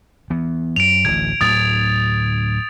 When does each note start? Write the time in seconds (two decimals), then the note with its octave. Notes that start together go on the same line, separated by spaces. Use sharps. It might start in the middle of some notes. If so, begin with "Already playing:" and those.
0.30 E3 B3
0.76 F#2 D7 F7
1.05 D1 A1 G#6
1.41 D2 A2 F#3 D#6 A6